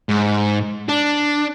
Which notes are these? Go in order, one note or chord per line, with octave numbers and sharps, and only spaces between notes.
G#2
D4